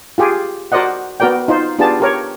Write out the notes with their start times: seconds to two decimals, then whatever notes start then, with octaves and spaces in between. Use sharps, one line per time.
0.18 F4 G4 G#4
0.72 F#4 A#4 C5 D5 D#5 F#5
1.20 B3 F#4 A#4 D5 G5
1.48 D#4 F4 C5
1.78 B3 D4 F4 G4 G#4 A5
2.00 G4 A#4 C#5